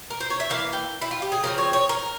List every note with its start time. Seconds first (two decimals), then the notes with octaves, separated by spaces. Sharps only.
0.10 A#4
0.21 C5
0.30 C#5
0.40 E5
0.50 E3 A#3 F5
0.73 G5
1.01 E4
1.11 F4
1.22 G4
1.32 G#4
1.43 C#3 F3 C4 A#4
1.58 C#5
1.73 C#5
1.89 A#4